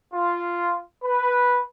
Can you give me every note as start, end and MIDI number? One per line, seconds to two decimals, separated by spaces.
0.14 0.79 65
1.03 1.61 71